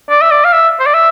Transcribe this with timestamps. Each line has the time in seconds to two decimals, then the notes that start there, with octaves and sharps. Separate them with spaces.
0.10 D5
0.21 E5
0.31 D5
0.45 F5
0.53 E5
0.80 C5
0.86 D5
0.94 E5